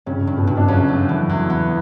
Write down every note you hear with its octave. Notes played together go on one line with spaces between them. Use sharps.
G2 C#3 C#4
G2
B2 B3
G2
D4
F#2 C#3 C#4
A3
E3
E2
B3